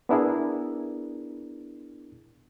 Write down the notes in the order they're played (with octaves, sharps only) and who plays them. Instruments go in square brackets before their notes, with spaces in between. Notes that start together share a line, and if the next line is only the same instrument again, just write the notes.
[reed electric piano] B3 D4 E4 G#4 A#4